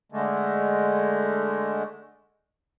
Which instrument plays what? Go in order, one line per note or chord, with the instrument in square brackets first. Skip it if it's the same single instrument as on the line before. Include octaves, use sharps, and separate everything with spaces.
[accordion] D3 G#3 A3